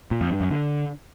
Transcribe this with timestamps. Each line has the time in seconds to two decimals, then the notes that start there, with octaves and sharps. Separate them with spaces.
0.11 A#2
0.21 F2
0.31 G2
0.41 F#2
0.50 D3